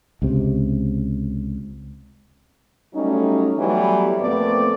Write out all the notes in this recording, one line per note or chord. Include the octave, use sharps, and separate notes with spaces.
C#2 C3
F#3 G3 A3 C#4 D#4
E3 F#3 G3 A3 B3 E4
F2 A#2 A3 B3 C4 D5